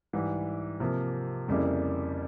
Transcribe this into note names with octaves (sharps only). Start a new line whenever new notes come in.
G#2 E3 G3
C3 F3 A#3
F2 C#3 G3 A#3 E4